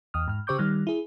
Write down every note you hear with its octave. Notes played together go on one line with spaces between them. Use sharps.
E2 D#6 F6
G#2 F6
C#3 G4 C5 C#6 D6 G6
D#3 G3 F6
E4 G#4